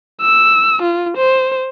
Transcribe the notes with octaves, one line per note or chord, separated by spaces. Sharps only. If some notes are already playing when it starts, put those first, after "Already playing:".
E6
F4
C5